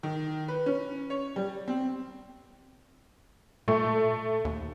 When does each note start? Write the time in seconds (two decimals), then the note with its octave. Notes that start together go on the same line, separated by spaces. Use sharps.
0.03 D#3
0.48 B4
0.66 C#4
1.10 C#5
1.36 G3
1.68 C4
3.68 A#2 A3
4.45 D#2